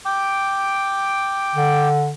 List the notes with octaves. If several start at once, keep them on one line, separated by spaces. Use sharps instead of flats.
G5 D6
D3